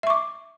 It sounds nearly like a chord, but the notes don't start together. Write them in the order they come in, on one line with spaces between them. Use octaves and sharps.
E5 C#6 D6